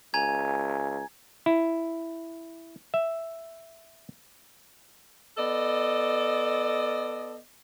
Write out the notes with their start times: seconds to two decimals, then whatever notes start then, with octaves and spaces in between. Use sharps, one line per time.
0.14 C#2 G#5 A#5 G#6
1.46 E4
2.94 E5
5.37 B3 A4 D5 D#5